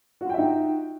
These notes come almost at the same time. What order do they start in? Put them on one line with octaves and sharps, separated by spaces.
F#4 F4 G5 E5 D#4